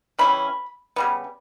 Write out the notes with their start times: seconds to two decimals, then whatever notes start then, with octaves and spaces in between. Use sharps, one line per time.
0.18 C#3 E3 G3 C#4 B5
0.96 C#3 G3 B3